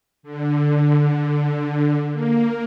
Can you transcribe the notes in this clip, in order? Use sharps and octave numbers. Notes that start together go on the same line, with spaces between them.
D3
A#3